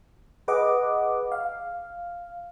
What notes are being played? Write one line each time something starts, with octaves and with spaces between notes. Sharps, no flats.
G#4 B4 D#5 F#5 D6
F5